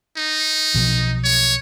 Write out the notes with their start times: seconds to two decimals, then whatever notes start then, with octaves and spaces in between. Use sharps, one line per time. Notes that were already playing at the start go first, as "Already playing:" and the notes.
0.17 D#4
0.74 B1 B2 F3
1.24 C#5